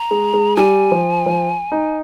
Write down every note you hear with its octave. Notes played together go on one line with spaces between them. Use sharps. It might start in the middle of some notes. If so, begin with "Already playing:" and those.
Already playing: A#5
G#3
G#3
G3 G#5
F3
F3
D#4